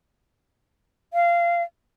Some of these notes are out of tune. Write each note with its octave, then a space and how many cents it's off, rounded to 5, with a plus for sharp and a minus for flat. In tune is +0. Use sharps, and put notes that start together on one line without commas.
F5 -20